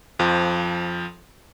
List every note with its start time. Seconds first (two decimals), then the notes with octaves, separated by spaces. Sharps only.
0.19 F2 F3